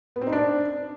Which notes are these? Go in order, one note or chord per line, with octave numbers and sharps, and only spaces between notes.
B3
C4
D#4
D4